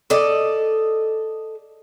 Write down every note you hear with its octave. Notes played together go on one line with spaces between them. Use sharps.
A4 D5 D#5